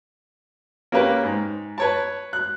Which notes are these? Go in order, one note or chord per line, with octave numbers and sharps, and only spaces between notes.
A#3 C#4 G4 A#4 B4
G#2
B4 C#5 A5
F#6